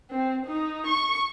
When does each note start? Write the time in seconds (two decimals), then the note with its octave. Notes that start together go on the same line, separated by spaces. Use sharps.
0.11 C4
0.46 D#4
0.86 C#6